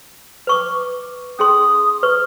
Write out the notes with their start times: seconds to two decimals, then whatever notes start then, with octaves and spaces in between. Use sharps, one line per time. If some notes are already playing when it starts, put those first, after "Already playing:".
0.47 B4 C#6 D6
1.39 C#4 G#4 C6 D#6
2.03 B4 C#6